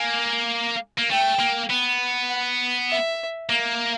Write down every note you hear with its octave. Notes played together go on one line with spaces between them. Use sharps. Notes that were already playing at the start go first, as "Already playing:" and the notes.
Already playing: A#3 G#5
A#3
A3 G5
A#3
B3
F#5
E5
A#3